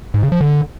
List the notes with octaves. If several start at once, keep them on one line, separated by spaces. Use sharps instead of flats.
G#2
C#3
F3
D3